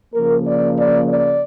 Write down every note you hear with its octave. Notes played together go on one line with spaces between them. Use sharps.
C#3 F3 A#3 A#4
D5
D5
D5